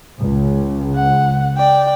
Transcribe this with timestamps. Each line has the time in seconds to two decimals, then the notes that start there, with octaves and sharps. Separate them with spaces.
0.22 C#2
0.95 F#5
1.57 D5 G5